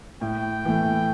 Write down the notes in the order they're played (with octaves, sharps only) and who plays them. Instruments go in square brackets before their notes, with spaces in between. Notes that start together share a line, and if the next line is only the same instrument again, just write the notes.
[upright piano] A2 [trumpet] G5
[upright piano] E3 A3